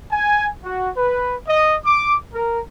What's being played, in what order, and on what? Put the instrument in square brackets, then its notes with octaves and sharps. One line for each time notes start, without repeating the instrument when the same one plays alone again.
[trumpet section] G#5
F#4
B4
D#5
D6
A#4